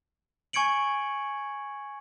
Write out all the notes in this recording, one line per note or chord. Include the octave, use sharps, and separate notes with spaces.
G#5 C#6 G#6 C#7 D7 F#7